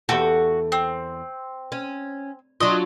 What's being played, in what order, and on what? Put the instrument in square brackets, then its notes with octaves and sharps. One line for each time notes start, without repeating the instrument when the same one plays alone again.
[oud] E2 G4 A4 [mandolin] F#4
[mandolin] C4
[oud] C#4
[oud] F#3 D4 F4 [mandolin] D#5